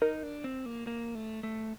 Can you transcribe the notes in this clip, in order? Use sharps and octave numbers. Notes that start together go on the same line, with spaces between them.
D#4 A#4
D4
C4
A#3
A#3
A3
A3